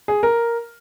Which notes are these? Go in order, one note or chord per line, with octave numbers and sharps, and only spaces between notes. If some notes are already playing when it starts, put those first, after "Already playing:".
G#4
A#4